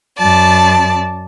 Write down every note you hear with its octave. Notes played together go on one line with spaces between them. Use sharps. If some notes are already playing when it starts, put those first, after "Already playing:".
F#2 D5 A5